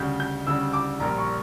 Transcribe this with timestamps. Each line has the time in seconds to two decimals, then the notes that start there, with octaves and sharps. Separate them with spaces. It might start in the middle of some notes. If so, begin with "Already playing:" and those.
Already playing: D2 C#3 G3 G6
0.20 G6
0.46 D2 C#3 G3 E6
0.73 D6
1.00 A#1 A#2 G3 A#5
1.18 C#6